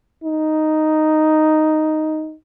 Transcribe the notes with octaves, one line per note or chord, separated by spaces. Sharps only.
D#4